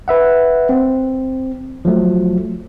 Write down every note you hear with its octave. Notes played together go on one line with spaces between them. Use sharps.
B4 E5 F#5
C4
F3 F#3 A3